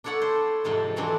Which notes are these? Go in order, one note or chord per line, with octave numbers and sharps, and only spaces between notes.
D4 E4 A4 C#5 F#5
C5
F2 G#2 C3 A5
D3 E3 F#3 C4 D4